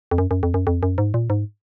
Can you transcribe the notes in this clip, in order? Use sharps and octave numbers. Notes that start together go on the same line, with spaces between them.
F2
F#2
F#2
F2
F#2
F2
F#2
G#2
A#2
G#2